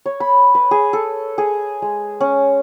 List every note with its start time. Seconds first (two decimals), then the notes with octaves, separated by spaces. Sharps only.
0.06 C#5
0.20 B5
0.55 B4
0.71 G#4
0.93 A4
1.38 G#4
1.82 G#3
2.21 C#4